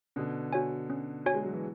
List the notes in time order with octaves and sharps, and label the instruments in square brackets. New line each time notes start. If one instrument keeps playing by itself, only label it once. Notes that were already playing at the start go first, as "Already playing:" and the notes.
[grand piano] B2 D3 [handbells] C#4
[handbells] F#4 C#5 G#5
C#4
F#4 C#5 G#5
[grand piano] G#3
F#3
E3